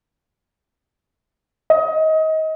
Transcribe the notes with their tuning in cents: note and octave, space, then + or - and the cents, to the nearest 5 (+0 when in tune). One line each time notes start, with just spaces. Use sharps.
D#5 +25